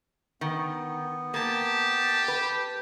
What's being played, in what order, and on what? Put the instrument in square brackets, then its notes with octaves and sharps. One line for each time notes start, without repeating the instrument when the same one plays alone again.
[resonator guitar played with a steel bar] D#3 [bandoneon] B3
[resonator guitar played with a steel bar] A#3 [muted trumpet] G4 [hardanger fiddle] A5
[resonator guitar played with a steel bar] B4